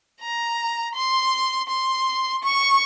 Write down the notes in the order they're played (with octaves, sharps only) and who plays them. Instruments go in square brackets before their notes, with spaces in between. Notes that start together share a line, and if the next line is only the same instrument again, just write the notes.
[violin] A#5
C6
C6
C#6